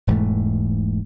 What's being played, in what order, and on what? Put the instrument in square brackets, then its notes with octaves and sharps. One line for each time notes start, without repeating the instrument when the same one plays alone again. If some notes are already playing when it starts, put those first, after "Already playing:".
[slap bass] E1 G#2 E3 A3